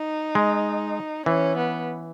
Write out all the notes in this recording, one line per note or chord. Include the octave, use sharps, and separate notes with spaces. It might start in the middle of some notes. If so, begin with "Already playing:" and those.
Already playing: D#4
G#3
E3 C#4
B3